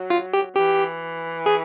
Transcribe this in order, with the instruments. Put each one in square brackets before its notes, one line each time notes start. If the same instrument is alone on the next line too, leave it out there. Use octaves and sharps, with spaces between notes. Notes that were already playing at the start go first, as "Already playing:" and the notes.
Already playing: [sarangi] F#3
[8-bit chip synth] F4
G4
[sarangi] E3 [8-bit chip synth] G4
[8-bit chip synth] G#4